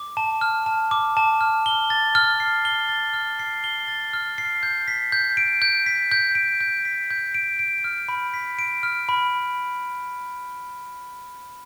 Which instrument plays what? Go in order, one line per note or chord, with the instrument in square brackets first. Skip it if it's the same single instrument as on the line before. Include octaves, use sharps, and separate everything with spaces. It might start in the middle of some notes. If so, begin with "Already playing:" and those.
Already playing: [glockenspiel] D6
A5
F6
A5
D6
A5
F6
G7
A6
F6
C7
G7
A6
F6
C7
G7
A6
F6
C7
G6
B6
G6
D7
G6
B6
G6
D7
G6
B6
G6
D7
D7
F6
B5
B6
D7
F6
B5